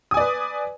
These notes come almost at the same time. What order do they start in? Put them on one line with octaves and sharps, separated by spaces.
D#6 G#5 D5 B4